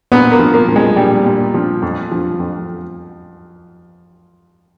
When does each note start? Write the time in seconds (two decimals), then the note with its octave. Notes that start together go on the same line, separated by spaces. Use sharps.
0.12 A#2 B3
0.32 A#3
0.39 F3
0.54 A#3
0.68 F3
0.76 G#3
0.96 A#2 G3
1.25 A#2
1.54 F3
1.82 F2
2.12 F3
2.39 F2